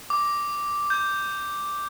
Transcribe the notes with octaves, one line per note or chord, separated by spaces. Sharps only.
D6
G6